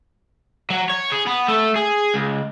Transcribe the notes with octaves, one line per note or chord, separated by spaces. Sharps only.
F#3
C#5
G#4
B3
A3
G#4
C#2